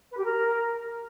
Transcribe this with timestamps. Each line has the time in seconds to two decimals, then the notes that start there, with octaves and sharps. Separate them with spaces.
0.10 B4
0.17 G4
0.24 A#4